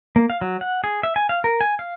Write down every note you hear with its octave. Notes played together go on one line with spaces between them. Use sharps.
A#3
F5
F#3
F#5
G#4
E5
G#5
F5
A#4
G#5
F5